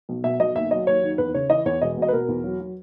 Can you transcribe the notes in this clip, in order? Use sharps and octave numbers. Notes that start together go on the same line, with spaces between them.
B1
B2 E5
B1 D#5
D#2 E5
F#3 D#5
D#2 C#5
D#3
E2 B4
C#3 C#5
E3 D#5
E2 C#5
E1 D#5
B2 D#5
B4
B2 A#4
E2
F#3
F#3